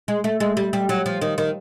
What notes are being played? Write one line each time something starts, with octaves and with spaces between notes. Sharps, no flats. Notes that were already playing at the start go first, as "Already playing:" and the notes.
G#3
A3
G#3
G3
G3
F#3
F3
D#3
D#3